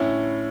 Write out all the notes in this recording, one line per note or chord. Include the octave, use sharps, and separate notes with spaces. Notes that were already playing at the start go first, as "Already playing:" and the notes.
Already playing: A2 D3 C#4 E4